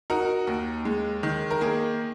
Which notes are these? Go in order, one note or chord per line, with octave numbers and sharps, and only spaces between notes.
D#4 F#4 A#4
D#2
G#3
D#3
A#4
A#3 G#4